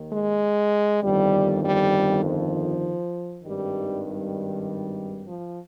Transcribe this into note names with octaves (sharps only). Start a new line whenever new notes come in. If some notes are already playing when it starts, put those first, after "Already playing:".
Already playing: D#2 D#3
G#3
G1 F2 D#3 G3
G3
F3
G#1 G2 D#3 G3
G3
F3